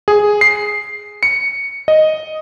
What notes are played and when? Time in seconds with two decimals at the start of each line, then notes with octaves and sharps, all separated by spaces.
0.08 G#4
0.41 C7
1.23 C#7
1.88 D#5